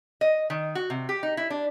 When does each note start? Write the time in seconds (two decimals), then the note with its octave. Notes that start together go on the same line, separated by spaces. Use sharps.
0.21 D#5
0.50 D#3
0.75 F#4
0.90 C3
1.09 G4
1.23 D#4
1.37 E4
1.50 D4